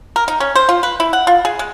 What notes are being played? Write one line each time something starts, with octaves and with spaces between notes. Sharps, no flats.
A#4
D#4
C#4
C5
F4
B4
E4
F#5
F4
G#4
G#3